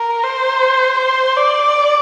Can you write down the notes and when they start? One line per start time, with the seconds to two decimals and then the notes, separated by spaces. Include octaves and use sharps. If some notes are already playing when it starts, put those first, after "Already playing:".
Already playing: A#4
0.24 C5
0.99 C5
1.37 D5